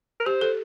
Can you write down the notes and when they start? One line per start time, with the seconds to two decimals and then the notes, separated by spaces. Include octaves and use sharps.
0.20 A#4
0.26 G4 C5
0.41 A4